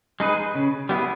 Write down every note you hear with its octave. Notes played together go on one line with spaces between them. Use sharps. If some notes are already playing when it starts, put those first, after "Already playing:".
G#3 D#4 G#4 B4
C#3
G3 B3 E4 G#4